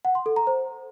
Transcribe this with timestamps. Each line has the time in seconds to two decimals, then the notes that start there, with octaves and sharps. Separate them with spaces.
0.05 F#5
0.15 C6
0.26 A4
0.36 A#5
0.47 C5